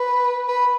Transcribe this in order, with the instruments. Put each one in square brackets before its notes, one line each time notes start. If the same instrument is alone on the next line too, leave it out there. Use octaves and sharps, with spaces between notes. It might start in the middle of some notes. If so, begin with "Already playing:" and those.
Already playing: [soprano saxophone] B4
B4